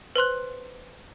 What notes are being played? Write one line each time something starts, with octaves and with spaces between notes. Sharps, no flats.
B4 C5 C6 F#6